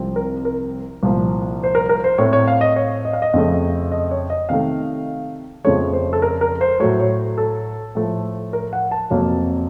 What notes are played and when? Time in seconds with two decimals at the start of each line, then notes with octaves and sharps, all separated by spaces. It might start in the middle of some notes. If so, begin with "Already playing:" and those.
Already playing: C2 C3 F3 C4
0.16 A#4
0.45 A#4
1.03 C2 A#2 F3
1.63 C5
1.75 A#4
1.89 A#4
2.04 C5
2.18 A2 A3 C4 C#5
2.33 C#5
2.48 F5
2.61 D#5
2.76 C#5
3.05 D#5
3.13 F5
3.22 D#5
3.34 F2 C#3 A3
3.92 D#5
4.11 C#5
4.30 D#5
4.49 C3 D#3 A3 F5
5.64 F2 C#3 F3 A3 C#5
5.93 C5
6.13 A4
6.22 A#4
6.41 A#4
6.61 C5
6.80 A2 F#3 A3 C#5
7.00 C#5
7.38 A4
7.95 A2 F3 A3
8.53 A#4
8.73 F#5
8.91 A5
9.10 F2 C3 F#3 A#3 C#4